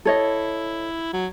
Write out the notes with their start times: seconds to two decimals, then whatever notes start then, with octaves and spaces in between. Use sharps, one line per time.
0.05 E4 A4 C#5 D#5
1.13 F#3